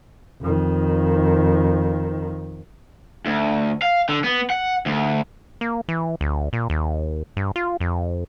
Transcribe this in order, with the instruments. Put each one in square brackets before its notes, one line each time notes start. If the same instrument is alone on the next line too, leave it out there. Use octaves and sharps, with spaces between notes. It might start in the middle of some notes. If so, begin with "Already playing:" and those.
[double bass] F2 D#3
[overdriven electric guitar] D2
F5
D3
B3
F#5
D2
[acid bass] A#3
E3
D2
A#2
D#2
G2
F4
F2